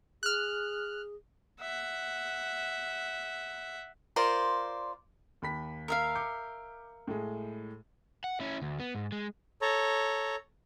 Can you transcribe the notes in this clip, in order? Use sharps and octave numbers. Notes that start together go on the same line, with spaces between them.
G#4 F6 F#6
E5 F#5
F4 A#4 C5 D5
D#2 B5 B6
A#4 E5 F5
D6 G6 C#7
A2 G#3
F#5
C#4 E4
D2
B3
G#2
G#3
A4 C#5 A#5